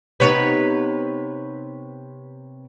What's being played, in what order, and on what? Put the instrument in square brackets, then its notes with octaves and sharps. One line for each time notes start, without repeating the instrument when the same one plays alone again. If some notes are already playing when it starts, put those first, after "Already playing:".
[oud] C3 B3 D#4 [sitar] B4 C#5